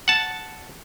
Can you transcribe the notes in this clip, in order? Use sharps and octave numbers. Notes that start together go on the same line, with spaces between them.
F#5 A5